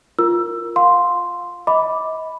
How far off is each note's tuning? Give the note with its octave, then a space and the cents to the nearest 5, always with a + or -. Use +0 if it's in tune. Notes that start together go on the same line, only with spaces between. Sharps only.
F4 +0 A#4 +0 E6 +15
F5 +25 C6 +0
D#5 +35 B5 +0 D6 +0